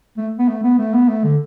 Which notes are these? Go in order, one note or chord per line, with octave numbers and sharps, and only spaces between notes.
A3
B3
A3
B3
A3
B3
A3
D3